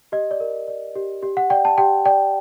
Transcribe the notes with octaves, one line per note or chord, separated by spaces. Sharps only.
G4 D#5
D5
A#4
D5
G4
G4
F#5
D5 G5
A5
G4 G5
D5 G5